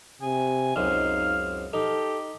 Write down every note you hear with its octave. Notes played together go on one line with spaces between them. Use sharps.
C3 G#5
C#2 F#2 C4 D#4 F5
D#4 G4 A4